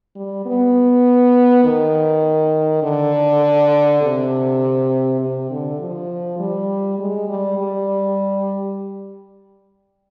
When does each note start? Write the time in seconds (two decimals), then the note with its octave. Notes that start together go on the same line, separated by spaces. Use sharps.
0.16 G3
0.46 B3
1.64 D#3
2.83 D3
4.02 C3
5.21 C3
5.51 D3
5.80 F3
6.39 G3
6.99 G#3
7.29 G3
7.58 G3